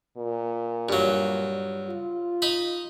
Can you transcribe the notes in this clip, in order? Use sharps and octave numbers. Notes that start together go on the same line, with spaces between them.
A#2
G2 F#3
F4
D#4 B5